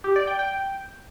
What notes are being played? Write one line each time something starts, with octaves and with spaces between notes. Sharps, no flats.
G4
D5
G5
G5